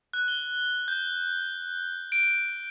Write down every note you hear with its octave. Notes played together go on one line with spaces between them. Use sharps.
F#6
G7
G6
D7